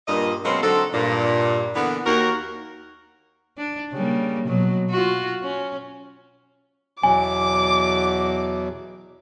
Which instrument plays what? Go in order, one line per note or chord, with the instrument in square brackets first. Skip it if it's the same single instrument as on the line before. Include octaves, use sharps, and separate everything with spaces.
[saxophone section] G2 A#2 D#5
B2 F#3 G#3 A#3 C4 C#4
D3 F#3 C4 D#4 A4
G2 A#2
D3 E3 A#3 B3
D#2 F#4 A#4
[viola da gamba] D4
C#3 G3 A#3
B2 F#3
F4 F#4
C#4
[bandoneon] E2 B2 F#3 [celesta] G#5 [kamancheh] D6